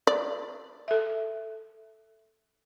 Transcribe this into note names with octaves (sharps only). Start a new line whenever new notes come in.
D5
A4 E5